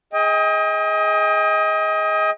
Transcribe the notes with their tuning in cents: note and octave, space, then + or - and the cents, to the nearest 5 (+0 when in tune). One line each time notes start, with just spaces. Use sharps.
G#4 +0 D#5 +25 G5 +40